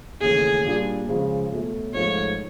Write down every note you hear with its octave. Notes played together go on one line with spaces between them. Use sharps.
D#2 C#3 E3 A3 C#4 G#4
A#2 G3 A#3 D4 F4
C#3 F3 G#3
B2 F#3 A3
G#2 F3 A3 C#5